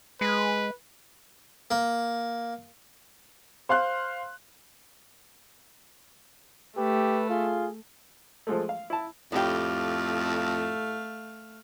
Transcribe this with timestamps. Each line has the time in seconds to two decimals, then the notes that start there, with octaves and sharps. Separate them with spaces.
0.21 G#3 B4
1.71 A#3
3.69 C5 F5 C6 F#6
6.77 A3 G4 B4
7.29 F4 G#4
8.47 F3 G#3 A3
8.69 F5
8.90 E4 A5
9.32 F2 A2 A3 G4 F5